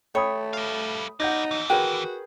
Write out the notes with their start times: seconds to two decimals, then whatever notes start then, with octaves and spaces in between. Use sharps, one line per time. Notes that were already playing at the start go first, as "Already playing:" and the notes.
0.15 A3 C#5 G5 B5 D#6
0.53 G3 F5
1.20 D#4 B4 D5 F#5 G6 A#6
1.51 D#2 E3
1.70 F#4 G#4 A#4 B4 G5